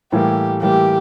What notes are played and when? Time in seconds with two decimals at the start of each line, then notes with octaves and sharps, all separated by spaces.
0.12 A2 E3 G3 A#3 G4
0.62 A2 E3 G3 A#3 G4